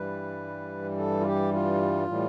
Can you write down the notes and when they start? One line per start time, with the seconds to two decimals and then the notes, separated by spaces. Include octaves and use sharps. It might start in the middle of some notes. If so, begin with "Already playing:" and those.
Already playing: G2 E3 G3 B4
0.98 A4
1.21 F4
1.25 G4
1.53 F4
2.07 A2 E3 G3